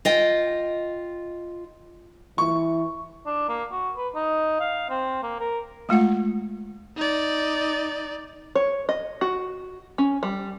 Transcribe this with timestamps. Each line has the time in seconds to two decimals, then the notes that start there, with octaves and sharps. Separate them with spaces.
0.05 F4 D#5 G5
2.38 E3 C#6
3.26 D4
3.49 A#3
3.72 F#4
3.97 B4
4.15 D#4
4.60 F5
4.90 C4
5.23 A#3
5.40 A#4
5.89 G#3 A3 F4 F#5
6.96 D#4 D5
8.55 C#5
8.89 D#5
9.21 F#4
9.98 C#4
10.23 G3